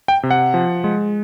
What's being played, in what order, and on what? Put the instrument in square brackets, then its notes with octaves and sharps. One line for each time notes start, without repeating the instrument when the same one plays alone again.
[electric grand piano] G5
C3
F#5
F3
G#3